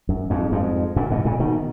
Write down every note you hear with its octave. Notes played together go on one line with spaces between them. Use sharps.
F#2
F2 G#2
F2 G#2
F#2 A#2
G#2 B2
A#2 C#3
B2 D#3